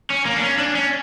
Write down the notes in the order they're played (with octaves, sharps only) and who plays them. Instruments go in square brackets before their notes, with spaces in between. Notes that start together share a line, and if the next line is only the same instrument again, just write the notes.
[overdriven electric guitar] C#4
A#3
D4
C#4
D4
C#4